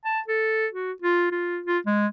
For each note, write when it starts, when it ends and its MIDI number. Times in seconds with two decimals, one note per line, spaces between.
0.05 0.20 81
0.28 0.67 69
0.73 0.92 66
1.02 1.30 65
1.31 1.60 65
1.66 1.79 65
1.86 2.07 56